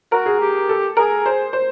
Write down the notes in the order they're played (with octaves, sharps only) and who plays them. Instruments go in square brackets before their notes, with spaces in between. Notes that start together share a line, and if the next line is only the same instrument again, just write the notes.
[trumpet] F#4 [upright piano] A#4
[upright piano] G#4
[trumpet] G4
[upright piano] A4
[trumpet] G#4 [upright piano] A#4
[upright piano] C5
C5